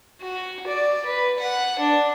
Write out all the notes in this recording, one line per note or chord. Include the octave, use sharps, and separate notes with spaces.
F#4
D5
B4
F#5
D4